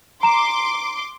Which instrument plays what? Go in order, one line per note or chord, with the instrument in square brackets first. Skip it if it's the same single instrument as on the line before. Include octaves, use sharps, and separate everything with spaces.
[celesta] A#5 E7 [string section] C6 D6